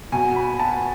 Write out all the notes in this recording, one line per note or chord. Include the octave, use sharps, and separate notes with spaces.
B2 G#5
B5
A5